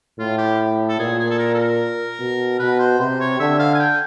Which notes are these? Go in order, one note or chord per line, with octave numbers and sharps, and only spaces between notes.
A2 F4
G4
A4
A#2 G#4
G#4
A4
A#4
A4
A#4
B2
B2 B4
C5
C3 C5
C#5
D3 E5
F5
G#5
G5